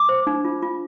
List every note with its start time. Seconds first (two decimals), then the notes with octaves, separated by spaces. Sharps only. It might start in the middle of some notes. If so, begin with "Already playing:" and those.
Already playing: D6
0.09 C5
0.27 D4
0.45 F4
0.62 F4